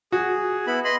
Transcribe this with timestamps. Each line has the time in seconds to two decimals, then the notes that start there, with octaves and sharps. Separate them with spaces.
0.12 F#4 G#4
0.67 B3 E4 B5
0.85 D#5 B5 C6